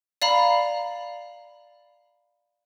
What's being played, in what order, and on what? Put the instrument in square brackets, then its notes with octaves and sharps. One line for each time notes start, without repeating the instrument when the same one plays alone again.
[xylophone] D5 F5 A#5 B5